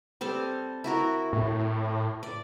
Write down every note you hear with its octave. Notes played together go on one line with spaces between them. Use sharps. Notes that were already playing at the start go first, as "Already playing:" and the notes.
G3 C4 A4
E4 F#4 A#4
A2
D5